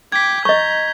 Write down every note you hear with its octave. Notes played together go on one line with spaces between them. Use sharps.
G5 D6 G#6 B6
D#5 A#5 C#6 G6